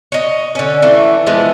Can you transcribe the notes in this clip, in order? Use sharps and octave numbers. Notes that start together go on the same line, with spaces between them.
C#5 D#5
D3 C#4
E3 A3
E3 F3 G#3 B3